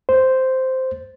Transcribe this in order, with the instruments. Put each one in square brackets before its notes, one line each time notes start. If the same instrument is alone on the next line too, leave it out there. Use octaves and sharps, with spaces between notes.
[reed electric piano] C5